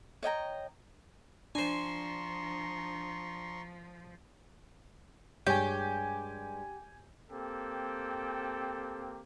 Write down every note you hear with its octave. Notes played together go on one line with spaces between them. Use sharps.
C#5 D#5 G5 A#5
F3 D4 C5 G#5 A#5 C6 C#6
G2 G#3 G4 C#5 G#5 G6
A#3 C4 G4 A4 G5